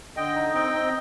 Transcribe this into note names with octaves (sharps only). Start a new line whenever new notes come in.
D3 D#5 G5
D#4
C4 D#5 G5
C4